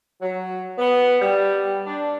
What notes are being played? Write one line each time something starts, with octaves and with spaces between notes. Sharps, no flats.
F#3
B3
G3
D4